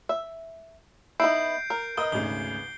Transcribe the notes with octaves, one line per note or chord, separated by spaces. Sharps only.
E5
B3 D#4 E4 G6 C7 D7
A#4
B3 A#4 D#5 D#6 G7
G#1 D2 C#3 G7